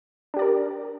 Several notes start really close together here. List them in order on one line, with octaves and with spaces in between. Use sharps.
D4 G4 D5 A#4